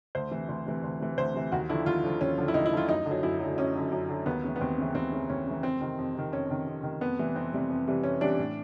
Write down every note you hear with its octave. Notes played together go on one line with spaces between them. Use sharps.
D2 C5
C3 E3
D2
C3 E3
D2
C3 E3
D2 C5
C3 E3
D#2 F#4
D3 F3 E4
D#2 F4
D3 F3
D#2 C#4
D3 F3
E4
D#2 D#4
E4
D3 F3 F4
F#2 D#4
D3
F#3
F#2 E4
D3 F#3
F#2 C#4
D3 F#3
F#2
D3 F#3
D#2 B3
C#3 E3
B3
D#2 C4
C#3 E3
D#2 C4
C#3 E3
D#2 C#4
C#3 E3
F2 C4
C3 D#3
F2
C3 D#3
F2 C#4
C3 D#3
F2
C3 D#3
F2 B3
C3 E3 G3
F2 C4
C3 E3 G3
F2
C3 E3 G3
F2 C#4
C3 E3 G3 D4
A2